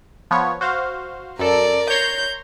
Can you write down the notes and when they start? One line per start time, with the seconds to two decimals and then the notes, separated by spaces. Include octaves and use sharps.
0.31 F3 B3 C#5
0.61 F#4 C5 F5
1.39 F#2 A4 A#4 D5
1.90 C#5 A#5 C6 G6